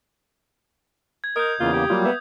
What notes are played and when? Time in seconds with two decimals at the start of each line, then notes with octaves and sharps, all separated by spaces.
1.24 G#6
1.36 A#4 D#5 D#6 G6
1.60 E2 C#3 A#3 F4
1.73 G4
1.90 F#3 G3 A#3 F4
2.05 B3 E5